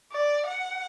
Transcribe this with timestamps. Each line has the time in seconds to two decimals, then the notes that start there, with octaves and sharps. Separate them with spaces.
0.12 D5
0.47 F#5